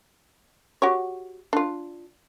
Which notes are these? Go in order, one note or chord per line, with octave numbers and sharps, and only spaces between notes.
F#4 G4 C#5
D4 F4